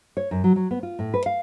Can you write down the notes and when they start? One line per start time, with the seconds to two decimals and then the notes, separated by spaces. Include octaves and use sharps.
0.17 C#5
0.31 F#2
0.44 F#3
0.56 F#3
0.71 B3
0.83 F4
0.99 A2
1.14 B4
1.26 F5